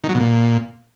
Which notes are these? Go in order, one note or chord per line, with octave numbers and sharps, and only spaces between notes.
D#3
F#3
B2
A#2